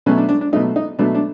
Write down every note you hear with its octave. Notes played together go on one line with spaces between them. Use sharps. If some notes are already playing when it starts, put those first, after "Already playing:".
B2 F#3 A3 C#4
D4
D4
D4
B2 F#3 A3 D#4
D#4
B2 F#3 A3 D4
D4